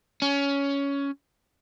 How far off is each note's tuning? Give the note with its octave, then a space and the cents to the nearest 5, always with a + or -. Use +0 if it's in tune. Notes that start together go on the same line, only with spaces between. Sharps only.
C#4 +15